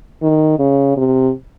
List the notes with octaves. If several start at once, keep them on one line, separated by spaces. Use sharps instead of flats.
D#3
C#3
C3